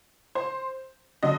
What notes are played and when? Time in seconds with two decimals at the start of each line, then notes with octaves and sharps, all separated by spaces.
0.35 C5
1.23 D3 F#3 D#5